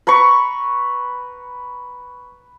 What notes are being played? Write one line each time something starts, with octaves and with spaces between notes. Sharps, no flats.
B4 A#5 B5 C#6